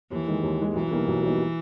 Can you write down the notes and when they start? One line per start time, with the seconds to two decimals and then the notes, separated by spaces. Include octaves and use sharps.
0.11 D#2 E3
0.27 D#3 G#3
0.43 D#2
0.59 D#3 G#3
0.75 B1 E3
0.91 B2 G3 A#3 D#4
1.07 B1
1.22 B2 G3 A#3 D#4